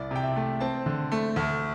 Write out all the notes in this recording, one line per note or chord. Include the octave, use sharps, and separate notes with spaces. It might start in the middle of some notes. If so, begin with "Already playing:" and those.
Already playing: C2 D5
C3 G5
E5
A3
C4 A5
D3
A3
D2